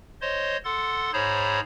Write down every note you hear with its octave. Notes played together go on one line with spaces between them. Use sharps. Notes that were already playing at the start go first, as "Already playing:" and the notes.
C5 C#5 D#5 C6
A4 F#5 C6 A6
G#2 G#4 C5 C#5 A#5 B5